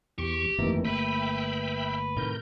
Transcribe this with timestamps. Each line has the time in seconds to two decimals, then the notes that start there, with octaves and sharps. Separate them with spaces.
0.18 E2 G4 C#6
0.58 G1 F2 D#3 E3 A3 A#3
0.85 B4 E5 G5 B5
2.17 A2 C3 D#3 A#4 G6